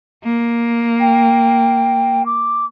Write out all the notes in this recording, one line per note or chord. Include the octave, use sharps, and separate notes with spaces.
A#3
G5
D6